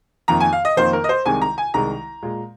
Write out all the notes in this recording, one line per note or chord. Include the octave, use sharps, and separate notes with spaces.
F2 D#3 A#3 A#5
G#5
F5
D#5
F2 D#3 A#3 C5
A#4
D#5
C5
C2 C3 D#3 G#3 G#5
A#5
G#5
C2 C3 D#3 G#3 A#5
A#2 G#3